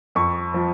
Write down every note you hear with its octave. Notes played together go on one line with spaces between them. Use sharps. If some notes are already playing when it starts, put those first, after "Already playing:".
F2 C#6
F3